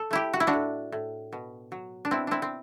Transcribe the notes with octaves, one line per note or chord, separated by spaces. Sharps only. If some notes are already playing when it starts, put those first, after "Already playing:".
Already playing: A4
A3 E4 G4
F#4
E4
D4 F#4
A2
A2
B2
F#3
D4
B2 C4 E4
C4 D4 E4
C4